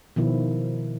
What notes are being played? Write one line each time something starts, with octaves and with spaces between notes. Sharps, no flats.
B2 D#3 F3 E4